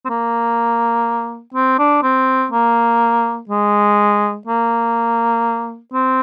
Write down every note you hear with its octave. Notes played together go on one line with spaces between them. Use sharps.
C4
A#3
C4
D4
C4
A#3
G#3
A#3
C4